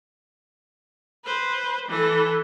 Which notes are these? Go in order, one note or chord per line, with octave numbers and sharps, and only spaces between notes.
B4 C5
E3 A4